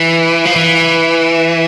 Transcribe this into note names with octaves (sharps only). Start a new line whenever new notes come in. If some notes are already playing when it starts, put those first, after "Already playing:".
Already playing: E3
F3
E3